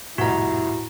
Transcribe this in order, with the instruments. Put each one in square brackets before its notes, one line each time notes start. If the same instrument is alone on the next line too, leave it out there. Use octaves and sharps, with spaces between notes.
[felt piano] C2 F2 [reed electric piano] A2 [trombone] E4 [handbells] F#4 A#5